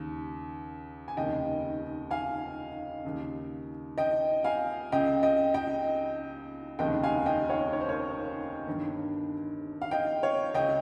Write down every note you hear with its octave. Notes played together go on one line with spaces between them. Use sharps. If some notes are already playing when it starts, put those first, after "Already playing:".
Already playing: D#2 C#3
G#5
F1 D#2 C#3 D#5 G5
F5 G#5
D#2 C#3
D#5 G5
F5 G#5
C#2 C#3 D#5 G5
D#5 G5
D#5 G5
F1 D#2 C#3 D#5 G5
F5 G#5
D#5 G5
C#5 F5
C#5
C5
A#4 C#5
G1 G2 D#3
F5
D#5 G5
C#5 F5
C#2 C#3 D#5 G5